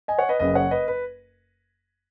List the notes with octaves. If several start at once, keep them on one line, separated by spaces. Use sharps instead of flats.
D#5 G#5
C#5 F#5
B4 D#5
F#1 F#2 C#3 B4 D#5
C#5 F#5
B4 D#5
B4